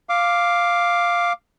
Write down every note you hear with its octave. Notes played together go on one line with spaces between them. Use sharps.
F5 D6